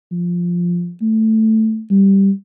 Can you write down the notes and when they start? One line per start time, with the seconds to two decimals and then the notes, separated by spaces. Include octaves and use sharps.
0.12 F3
1.02 A3
1.90 G3